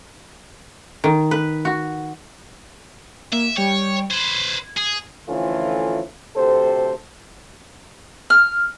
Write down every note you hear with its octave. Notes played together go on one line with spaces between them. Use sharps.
D#3
B4
F#4
A#3 E5
G3 C#5 G5
B4 C5 G#6
G#4
D3 E3 F3 A3 C#4 F4
D2 C3 G4 A4 C5
F6